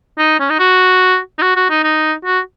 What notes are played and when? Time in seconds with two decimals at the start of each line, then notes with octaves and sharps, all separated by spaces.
0.18 D#4
0.40 C#4
0.50 D#4
0.59 F#4
1.39 D#4
1.42 F#4
1.56 F#4
1.70 D#4
1.84 D#4
2.25 F#4